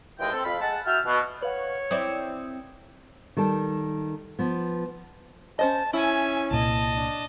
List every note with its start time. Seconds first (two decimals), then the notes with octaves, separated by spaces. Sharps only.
0.19 D#2 E3 G#3 A4 G5
0.32 C4 A4
0.44 F2 F5 B5
0.60 G#3 F#5 A5
0.85 E4 F#4 E5 G5 A5 F6
1.05 B2
1.42 B4 C#5 F5 F#5
1.91 C4 E4 D5 D#6
3.37 D#3 G3 A4
4.39 F3 B3
5.59 C#4 C5 D#5 A5
5.93 C#4 E4 E5 G#5
6.51 C2 A#2 D#5 A5
6.95 D4